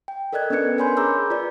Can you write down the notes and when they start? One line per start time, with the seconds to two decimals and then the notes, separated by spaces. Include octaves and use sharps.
0.08 G5
0.33 A4 A#4 D5 D#5 F#6 G#6
0.50 B3 C#4 D4 B4 G#6 C#7
0.78 A#4 C#5 G#5 B5 C6 G6
0.97 G#4 A#5 D6 E6 G6
1.30 F4 B4 D5